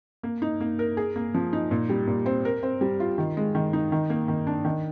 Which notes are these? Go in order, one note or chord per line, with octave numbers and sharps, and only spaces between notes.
A#3
D#4
A#3
A#4
G#4
A#3
F3
D#4
A#2
G3
A#2
C4
A#4
C4
G3
F4
D#3
G#3
D#3
D#4
D#3
A#3
D#3
D4
D#3